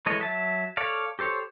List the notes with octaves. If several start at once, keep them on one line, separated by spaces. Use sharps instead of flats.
E3 G#3 A4 C#5 D#5
F#3 E5 A5
A4 C#5 D5 F5
G4 A4 C5 C#5